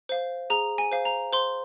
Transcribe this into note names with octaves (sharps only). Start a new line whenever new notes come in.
C5 F5
G#4 A#5
G#5
C5 F5
A#5
C5 C6